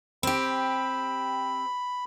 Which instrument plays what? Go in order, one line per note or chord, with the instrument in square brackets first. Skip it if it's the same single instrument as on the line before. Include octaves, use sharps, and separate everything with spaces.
[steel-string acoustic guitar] C4 G4 [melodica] B5